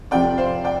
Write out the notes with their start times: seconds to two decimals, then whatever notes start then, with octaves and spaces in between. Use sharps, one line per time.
0.11 F2 C3 F3 C4 D5 G5
0.37 C5 F5
0.64 D5 G5